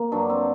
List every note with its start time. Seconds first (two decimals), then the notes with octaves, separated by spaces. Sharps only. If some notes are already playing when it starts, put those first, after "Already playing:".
Already playing: A#3
0.12 G2 F#3 D4
0.30 C4